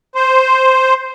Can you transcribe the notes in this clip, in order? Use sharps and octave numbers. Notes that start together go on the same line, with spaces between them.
C5